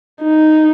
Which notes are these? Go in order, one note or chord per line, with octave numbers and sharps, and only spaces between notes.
D#4